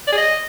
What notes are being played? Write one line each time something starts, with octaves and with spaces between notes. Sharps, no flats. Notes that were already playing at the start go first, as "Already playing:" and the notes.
D5
G#4
D#5